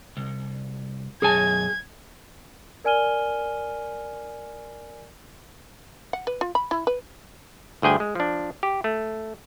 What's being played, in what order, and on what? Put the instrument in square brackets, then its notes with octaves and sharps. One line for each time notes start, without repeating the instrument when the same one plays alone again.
[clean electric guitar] C2
[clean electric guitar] B1 F#2 G#5 [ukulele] G#4 A5 [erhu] G#6
[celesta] A#4 D5 G#5 F6 D#7 G7
[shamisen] F#5
B4
F4
B5
E4
B4
[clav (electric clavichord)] G1 D2 G#4 G5 G#5
G#3
F3 D4
G4
A3